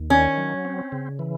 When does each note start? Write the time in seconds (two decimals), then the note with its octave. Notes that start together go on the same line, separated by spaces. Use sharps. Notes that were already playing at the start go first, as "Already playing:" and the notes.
Already playing: D#2
0.10 D#3 C#4
0.38 F#3
0.65 C4
0.92 C#3
1.19 E3